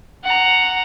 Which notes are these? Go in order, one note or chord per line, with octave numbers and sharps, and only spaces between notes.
F#5 A#5